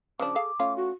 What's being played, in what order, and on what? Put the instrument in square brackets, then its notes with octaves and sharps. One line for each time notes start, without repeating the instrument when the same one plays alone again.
[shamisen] C#3 F3 D4 [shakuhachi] D6
[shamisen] G#4 A4 F5
A3 C#4 F4
[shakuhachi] F#4